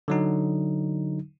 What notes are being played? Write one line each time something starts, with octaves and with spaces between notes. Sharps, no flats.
D3 F#3 D#4